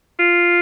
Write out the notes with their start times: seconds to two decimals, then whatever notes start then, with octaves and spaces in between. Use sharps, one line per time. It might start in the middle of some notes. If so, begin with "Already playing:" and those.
0.19 F4